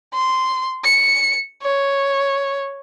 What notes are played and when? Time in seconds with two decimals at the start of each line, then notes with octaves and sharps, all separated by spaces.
0.14 C6
0.84 C#7
1.63 C#5